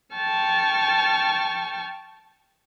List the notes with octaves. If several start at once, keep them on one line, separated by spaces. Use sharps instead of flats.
G5 A5 C#6 F6